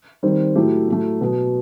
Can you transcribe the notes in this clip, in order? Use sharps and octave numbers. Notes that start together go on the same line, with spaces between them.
D#3 G3 C4
A2 F#3 A3 E4 G4
A2 F#3 A3
B2 F#3 B3